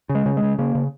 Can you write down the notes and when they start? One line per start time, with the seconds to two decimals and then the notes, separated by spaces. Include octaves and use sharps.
0.09 C#3
0.15 G#3
0.26 C#3
0.37 G#3
0.43 C#3
0.58 C#3 A#3
0.75 C#3